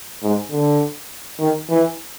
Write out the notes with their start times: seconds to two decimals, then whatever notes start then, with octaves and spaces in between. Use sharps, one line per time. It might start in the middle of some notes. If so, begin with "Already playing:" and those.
0.23 G#2
0.52 D3
1.40 D#3
1.70 E3